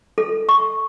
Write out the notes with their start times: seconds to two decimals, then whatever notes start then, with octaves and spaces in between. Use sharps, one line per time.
0.18 A4
0.49 C#6